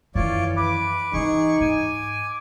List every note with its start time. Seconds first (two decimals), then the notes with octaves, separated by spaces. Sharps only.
0.15 F#2 D#3 E3 F4 C#5 D5
0.56 B4 D6
1.13 C#3 E3 D#4 G#4 C#6
1.61 G#2 G#5